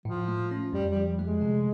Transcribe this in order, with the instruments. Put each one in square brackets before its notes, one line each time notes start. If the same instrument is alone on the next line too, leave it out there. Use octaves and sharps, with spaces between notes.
[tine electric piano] A2 [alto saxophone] F3
[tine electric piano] A3
C#4
[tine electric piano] F2 [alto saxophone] G3
[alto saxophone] G3
[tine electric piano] F3
A3
[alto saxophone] G#3
[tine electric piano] C3